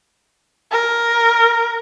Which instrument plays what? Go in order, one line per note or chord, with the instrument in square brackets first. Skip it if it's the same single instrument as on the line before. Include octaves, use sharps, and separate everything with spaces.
[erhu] A#4